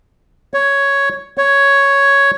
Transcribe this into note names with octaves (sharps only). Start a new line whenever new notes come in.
C#5
C#5